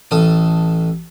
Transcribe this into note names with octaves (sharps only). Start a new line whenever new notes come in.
A1 A4 D#6